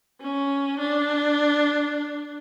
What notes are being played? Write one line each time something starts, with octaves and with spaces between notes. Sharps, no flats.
C#4
D4